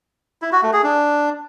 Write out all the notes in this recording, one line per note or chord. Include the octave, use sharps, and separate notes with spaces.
E4
F#4
A3
G#4
D4